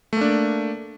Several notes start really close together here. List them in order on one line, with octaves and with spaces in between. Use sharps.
A3 A#3 D4